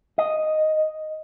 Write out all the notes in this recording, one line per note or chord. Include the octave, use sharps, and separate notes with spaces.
D#5